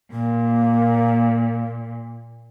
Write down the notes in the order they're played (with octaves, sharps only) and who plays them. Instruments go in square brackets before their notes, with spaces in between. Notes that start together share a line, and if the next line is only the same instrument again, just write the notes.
[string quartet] A#2 [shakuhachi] A#3